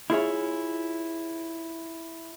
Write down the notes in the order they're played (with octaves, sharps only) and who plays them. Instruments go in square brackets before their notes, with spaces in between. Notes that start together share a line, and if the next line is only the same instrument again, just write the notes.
[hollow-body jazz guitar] E4 F4 G#4 C#5